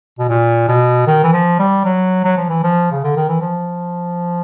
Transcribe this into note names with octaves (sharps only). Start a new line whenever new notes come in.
B2
A#2
B2
D#3
E3
F3
G3
F#3
F#3
F3
E3
F3
C#3
D3
D#3
E3
F3